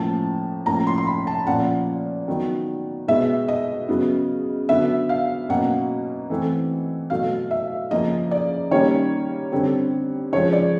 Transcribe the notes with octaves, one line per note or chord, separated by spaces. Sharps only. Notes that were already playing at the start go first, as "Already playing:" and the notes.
Already playing: A2 F3 A#3 C#4 A5
A2 F3 A#3 C#4 A#5
C6
C6
B5
A5
A#2 F3 A#3 C#4 F#5
D#3 F#3 B3
B2 G#3 B3 E5
D#5
C#3 F#3 B3
D3 F#3 B3 E5
F5
B2 F#3 A#3 C#4 F#5
E3 A3 C4
B2 F#3 A3 F5
E5
C#3 F3 A#3 C#4 D#5
D5
D#3 G3 A#3 C#4 C#5
D3 G3 C4
C#3 F3 G#3 C#5
D5